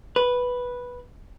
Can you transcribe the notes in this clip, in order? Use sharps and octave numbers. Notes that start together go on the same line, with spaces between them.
B4